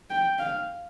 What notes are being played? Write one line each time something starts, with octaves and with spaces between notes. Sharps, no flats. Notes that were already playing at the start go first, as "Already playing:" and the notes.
G5
F5